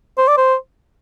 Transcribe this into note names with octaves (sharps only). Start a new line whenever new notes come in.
C5
D5
C5